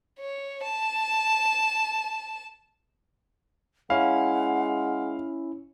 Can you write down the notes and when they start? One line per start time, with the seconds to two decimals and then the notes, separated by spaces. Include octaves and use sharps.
0.20 C#5
0.63 A5
3.90 G#3 C#4 E4 F5 F#5